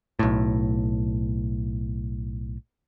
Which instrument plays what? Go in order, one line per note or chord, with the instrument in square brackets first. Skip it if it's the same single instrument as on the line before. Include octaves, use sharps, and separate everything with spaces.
[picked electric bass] B1 A2